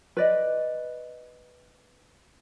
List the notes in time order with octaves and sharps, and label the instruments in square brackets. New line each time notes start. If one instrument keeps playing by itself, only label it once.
[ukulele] B4 D5 D#5